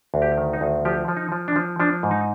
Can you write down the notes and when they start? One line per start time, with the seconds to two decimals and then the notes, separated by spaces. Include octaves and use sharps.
0.14 D2
0.22 G4
0.37 D#3
0.53 D#4
0.61 D2
0.85 F3 G4
1.08 F3
1.17 D#4
1.32 F3
1.48 D4
1.56 F3
1.80 F3 D4
2.03 G#2
2.11 D#4